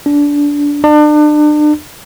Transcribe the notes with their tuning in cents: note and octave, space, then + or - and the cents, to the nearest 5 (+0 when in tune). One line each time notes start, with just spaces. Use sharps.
D4 -20
D4 +35